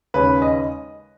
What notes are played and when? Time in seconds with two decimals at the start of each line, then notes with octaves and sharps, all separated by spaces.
0.14 D#2 C#3 G#3 C#4 B4
0.42 D#5